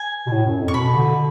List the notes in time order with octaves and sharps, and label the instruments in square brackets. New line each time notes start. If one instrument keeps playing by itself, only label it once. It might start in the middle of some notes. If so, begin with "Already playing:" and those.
Already playing: [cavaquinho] G#5
[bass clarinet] B2
A2
F#2
F2
[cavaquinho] C#6
[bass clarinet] B2 [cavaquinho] B5
[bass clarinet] D3